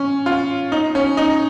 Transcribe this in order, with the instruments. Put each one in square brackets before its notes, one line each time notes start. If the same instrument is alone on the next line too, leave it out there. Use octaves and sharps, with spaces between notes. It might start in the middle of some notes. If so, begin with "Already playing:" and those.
Already playing: [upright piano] C#4
F4
D#4
C#4
D#4